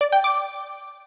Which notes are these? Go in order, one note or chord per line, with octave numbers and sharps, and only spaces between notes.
D5
G5
D6